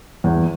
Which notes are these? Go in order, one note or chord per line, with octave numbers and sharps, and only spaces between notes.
E2